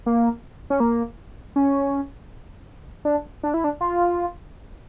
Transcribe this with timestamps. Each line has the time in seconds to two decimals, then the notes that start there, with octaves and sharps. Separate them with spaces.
0.06 A#3
0.70 C#4
0.80 A#3
1.56 C#4
3.05 D4
3.43 D4
3.54 E4
3.64 D4
3.81 F4